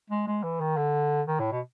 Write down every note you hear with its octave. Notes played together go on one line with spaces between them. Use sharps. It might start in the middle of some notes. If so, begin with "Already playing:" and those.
G#3
G#3
E3
D#3
D3
D#3
A2
B2